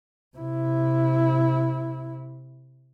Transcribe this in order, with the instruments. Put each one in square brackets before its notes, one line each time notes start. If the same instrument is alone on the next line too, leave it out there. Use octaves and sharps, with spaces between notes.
[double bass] C3 E4